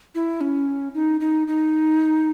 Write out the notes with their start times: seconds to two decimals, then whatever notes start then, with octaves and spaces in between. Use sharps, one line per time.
0.15 E4
0.41 C#4
0.95 D#4
1.20 D#4
1.48 D#4